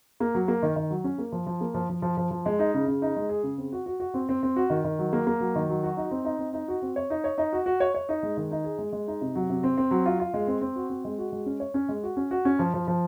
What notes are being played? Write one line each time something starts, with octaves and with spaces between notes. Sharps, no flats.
A#3
F#3
A#3
D#3
D#3
F#3
C#4
A#3
F3
F3
A#3
F3
F3
F3
F3
F3
G#3
D#4
C#3
C#3
D#4
G#3
G#4
C#3
C4
F#4
F#4
F#4
C4
C4
C4
F#4
D#3
D#3
F#3
A#3
A#3
F#3
D#3
F#3
F#4
D#4
C4
D#4
C4
D#4
F#4
C4
C#5
D#4
C#5
D#4
F#4
F#4
C#5
C#5
D#4
G#3
D#3
D#4
G#4
G#3
G#3
D#4
C3
F#3
C3
C4
C4
F#3
F4
F4
G#3
C4
C4
F#4
C4
G#3
F#4
G#3
C#4
C#5
C#4
G#3
F#4
C#4
F#4
C#4
F3
F3
F3